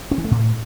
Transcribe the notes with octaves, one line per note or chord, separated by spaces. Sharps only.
C#4
E3
A3
A2